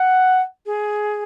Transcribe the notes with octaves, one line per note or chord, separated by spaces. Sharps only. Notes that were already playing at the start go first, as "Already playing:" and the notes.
Already playing: F#5
G#4